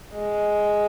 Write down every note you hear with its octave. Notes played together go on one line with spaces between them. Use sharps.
G#3